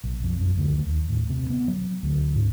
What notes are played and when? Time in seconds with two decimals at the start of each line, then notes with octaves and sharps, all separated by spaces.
0.04 B1
0.23 F2
0.40 F#2
0.57 D2
0.78 D#2
1.09 A2
1.30 C3
1.50 B3
1.68 F#3
2.03 D2
2.35 G#2